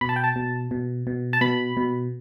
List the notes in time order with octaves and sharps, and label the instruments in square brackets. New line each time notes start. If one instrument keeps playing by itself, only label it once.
[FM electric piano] B2 B5
A5
G5
A5
B2
B2
B2
A5
B2 B5
B2